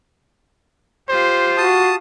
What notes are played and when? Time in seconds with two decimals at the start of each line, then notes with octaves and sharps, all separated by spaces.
1.09 F4 G4 C5
1.57 F#4 A5 D#6